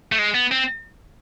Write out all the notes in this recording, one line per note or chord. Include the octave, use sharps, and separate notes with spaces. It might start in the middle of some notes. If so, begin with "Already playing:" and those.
A3
G#3
B3
C4